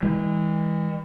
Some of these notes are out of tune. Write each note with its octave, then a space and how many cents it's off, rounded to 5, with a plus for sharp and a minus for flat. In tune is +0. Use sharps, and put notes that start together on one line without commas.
E3 -30 G#3 -35